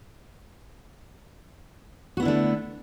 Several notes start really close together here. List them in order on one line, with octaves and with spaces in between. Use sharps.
F#4 B3 E4 D3 A3